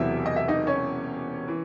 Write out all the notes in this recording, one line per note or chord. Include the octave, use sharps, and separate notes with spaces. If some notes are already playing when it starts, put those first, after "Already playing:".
Already playing: E1 E2 C3 F#3 E4 E5
D#5
E5
D#4 D#5
C#4 C#5
E3